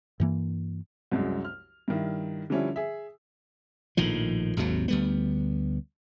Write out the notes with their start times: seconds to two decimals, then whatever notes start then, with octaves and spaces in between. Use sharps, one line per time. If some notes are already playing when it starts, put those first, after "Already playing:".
0.20 G2 E3 A#3
1.12 C2 F#2 G#3
1.45 F6
1.88 G2 D#3 E4
2.50 D3 F3 G3 C#4 E4
2.76 G#4 E5
3.97 A#1 A2 D#3 F3
4.57 G#1 D#2 C3 F#3
4.88 D2 G3 B3